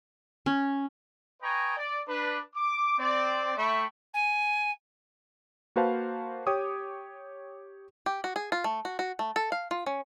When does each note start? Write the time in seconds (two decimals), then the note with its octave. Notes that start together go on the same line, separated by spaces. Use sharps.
0.46 C#4
1.42 B4 D#5 G5 G#5 A#5 C#6
1.77 D5
2.08 D4 B4
2.55 D6
2.98 C4 D5
3.57 A3 E5 G5 B5 C#6
4.13 G#5
5.76 A#3 F#4 B4 C5 F5 A5
6.47 G4 C#5 G5 D6 D#6
8.06 G4
8.24 F#4
8.36 G#4
8.52 F4
8.64 A3
8.85 F#4
8.99 F#4
9.19 A3
9.36 A4
9.52 F5
9.71 F4
9.86 C#4